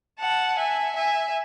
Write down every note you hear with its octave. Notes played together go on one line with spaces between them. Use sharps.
F#5 A5
E5 G#5
E5 G#5